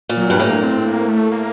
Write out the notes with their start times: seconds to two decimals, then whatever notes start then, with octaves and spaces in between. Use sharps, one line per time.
0.09 A#2
0.17 F#3
0.30 G2
0.40 A2 A#3
0.63 C4
0.86 A#3
1.08 A3
1.31 A#3